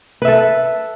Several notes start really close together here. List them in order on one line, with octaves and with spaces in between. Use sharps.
B4 E5 A4